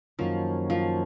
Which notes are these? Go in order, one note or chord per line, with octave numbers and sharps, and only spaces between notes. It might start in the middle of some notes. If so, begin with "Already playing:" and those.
F#2 D#3 F3 F#3 A#3 C#4
F3